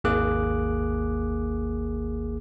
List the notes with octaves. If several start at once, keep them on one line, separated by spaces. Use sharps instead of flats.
G#1 D#2 A#3 G#4 D6 F#6